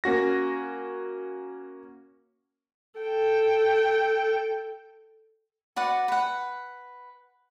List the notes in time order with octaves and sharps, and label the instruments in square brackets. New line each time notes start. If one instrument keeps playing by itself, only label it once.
[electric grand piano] A#3 C#4 F#4 A#6
[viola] A4 G5
[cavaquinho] F#4 B4 D5 F#5
B4 F#5